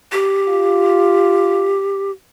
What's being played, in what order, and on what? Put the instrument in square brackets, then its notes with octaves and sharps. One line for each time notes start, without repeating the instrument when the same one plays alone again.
[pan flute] G4
[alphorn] F4